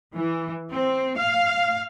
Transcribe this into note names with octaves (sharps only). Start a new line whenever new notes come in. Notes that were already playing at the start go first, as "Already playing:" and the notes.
E3
C4
F5